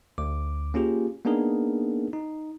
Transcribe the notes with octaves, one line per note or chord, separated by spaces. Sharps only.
D2 D6
A#3 C#4 F4 G4 G#4
A#3 B3 D4 D#4 G#4 A#4
D#4